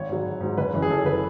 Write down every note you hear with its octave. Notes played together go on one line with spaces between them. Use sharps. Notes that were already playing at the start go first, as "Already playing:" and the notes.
Already playing: G#1 C#5
G#2 F#3
G#1
G#2 F#3
F#1 B4
F#2 E3
G#4
F#1 A4
E3 B4